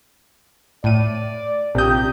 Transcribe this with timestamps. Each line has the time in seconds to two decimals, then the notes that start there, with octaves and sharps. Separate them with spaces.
0.84 A2 D5 D#7
1.75 A#1 C3 G4 D#6 G6